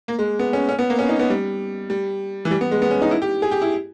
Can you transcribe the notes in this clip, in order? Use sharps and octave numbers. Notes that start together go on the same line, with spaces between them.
A#3
G#3
B3
C#4
C#4
B3
A#3
C#4
D#4
B3
G3
G3
E3
G3
B3
G#3
B3
C#4
D#4
E4
G4
G#4
G4
E4